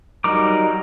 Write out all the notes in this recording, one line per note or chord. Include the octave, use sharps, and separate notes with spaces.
F#3 G3 D#4 A#4 D6